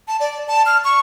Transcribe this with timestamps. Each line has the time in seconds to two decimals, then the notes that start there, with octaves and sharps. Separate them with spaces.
0.08 A5
0.20 D5
0.48 A5
0.66 F6
0.84 C#6